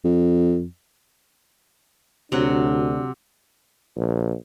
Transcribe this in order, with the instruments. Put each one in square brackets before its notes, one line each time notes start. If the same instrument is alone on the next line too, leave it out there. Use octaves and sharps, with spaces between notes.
[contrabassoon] F2
[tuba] D2 [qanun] C3 F#3 F#5 [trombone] D4
[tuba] A#1